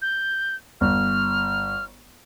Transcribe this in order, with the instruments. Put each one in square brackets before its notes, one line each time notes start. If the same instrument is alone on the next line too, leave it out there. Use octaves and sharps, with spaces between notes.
[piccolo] G6
[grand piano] G1 [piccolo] F6